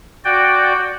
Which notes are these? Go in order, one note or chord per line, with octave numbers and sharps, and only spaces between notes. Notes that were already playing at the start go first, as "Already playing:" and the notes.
F#4 D5 G5